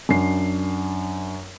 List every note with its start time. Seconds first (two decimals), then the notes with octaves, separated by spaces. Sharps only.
0.09 F#2 D4 C7